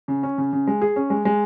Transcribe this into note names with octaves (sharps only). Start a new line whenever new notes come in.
C#3
C#4
C#3
C#3
G#3
G#4
C#4
G#3
G#3